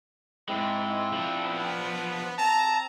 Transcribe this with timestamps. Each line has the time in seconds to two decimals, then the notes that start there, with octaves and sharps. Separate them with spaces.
0.49 G#2 G#3 C4 E4
1.13 F3 D4
1.44 B3
2.38 C4 A5 A#5